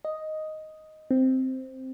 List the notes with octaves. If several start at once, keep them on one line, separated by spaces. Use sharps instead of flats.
D#5
C4